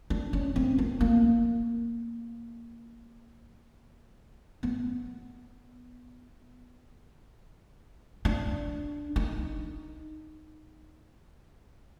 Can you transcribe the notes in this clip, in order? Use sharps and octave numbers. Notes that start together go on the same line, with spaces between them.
D4
C#4
C4
B3
A#3
B3
D4
D#4